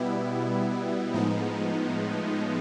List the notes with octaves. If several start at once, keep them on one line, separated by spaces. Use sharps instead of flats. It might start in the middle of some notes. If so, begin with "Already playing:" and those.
Already playing: B2 G3 B3 E4
A2 F3 G#3 B3 D#4